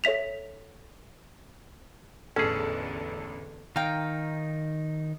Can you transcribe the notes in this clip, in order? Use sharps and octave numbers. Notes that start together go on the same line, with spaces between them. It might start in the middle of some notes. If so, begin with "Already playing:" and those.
A4 C#5 E5 B6 F7
A1 E2 D3 C#4 G#4 A4
D#3 D#4 F5 G5 A#5